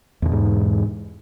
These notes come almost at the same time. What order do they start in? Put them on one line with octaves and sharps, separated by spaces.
E2 D3 B2 G#2